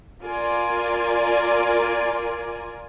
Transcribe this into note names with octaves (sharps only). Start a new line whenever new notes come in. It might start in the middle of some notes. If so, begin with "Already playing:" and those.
F4 A#4 D5 G#5